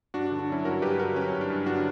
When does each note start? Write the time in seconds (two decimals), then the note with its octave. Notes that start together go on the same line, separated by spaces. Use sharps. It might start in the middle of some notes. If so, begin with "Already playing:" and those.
0.14 G2 D4 F#4
0.27 D4
0.31 D3
0.39 D4
0.48 F#3 C#4 E4
0.65 G2 F#4 A#4
0.82 G2 G4 B4
0.99 D3 F#4 A#4
1.16 F#3 C#4
1.33 G2
1.41 D4
1.50 G2
1.66 D3 D4 F#4